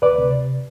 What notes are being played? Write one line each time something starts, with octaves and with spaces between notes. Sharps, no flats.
D2 B4 D5
C3